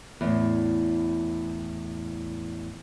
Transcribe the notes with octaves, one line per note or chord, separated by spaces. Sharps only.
E2 A2